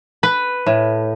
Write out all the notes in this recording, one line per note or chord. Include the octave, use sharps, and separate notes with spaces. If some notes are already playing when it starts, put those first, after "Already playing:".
B4
A2